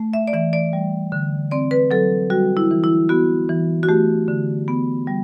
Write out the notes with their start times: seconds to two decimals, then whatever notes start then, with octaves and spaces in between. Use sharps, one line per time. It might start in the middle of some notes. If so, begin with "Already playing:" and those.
Already playing: A3
0.13 E5
0.28 D5
0.33 E3 E5
0.53 D5
0.73 G3
1.12 D3
1.51 C4 D5
1.71 B4
1.91 F#3 A4
2.30 G3 F#4
2.57 E4
2.71 E3
2.84 E4
3.09 B3 F#4
3.49 E3
3.83 F#4
3.89 A3 G4
4.28 D3
4.68 B3
5.07 G3